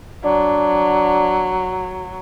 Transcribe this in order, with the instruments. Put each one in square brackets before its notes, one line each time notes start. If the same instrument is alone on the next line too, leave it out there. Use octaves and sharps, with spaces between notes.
[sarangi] F#3 [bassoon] D4